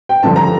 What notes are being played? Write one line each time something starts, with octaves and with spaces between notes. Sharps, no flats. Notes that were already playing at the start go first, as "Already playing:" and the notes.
G5
G2 D3 F3 A5
A#5